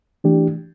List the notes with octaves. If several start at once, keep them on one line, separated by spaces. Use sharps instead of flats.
E3 A3 D4 G4